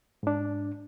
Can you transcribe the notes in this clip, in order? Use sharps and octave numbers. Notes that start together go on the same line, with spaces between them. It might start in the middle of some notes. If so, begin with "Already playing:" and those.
G#2 D4